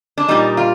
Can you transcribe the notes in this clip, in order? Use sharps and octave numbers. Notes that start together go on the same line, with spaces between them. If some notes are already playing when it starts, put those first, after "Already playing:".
D4
A#2 G3 D#4
F4